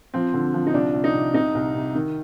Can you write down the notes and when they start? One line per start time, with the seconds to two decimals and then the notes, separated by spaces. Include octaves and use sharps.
0.14 F3 C4
0.33 D3
0.54 F3
0.67 D#4
0.74 C2 D4
0.94 C2
1.04 D#4
1.14 C3
1.34 C2 D#4
1.55 C2
1.75 C3
1.95 D#3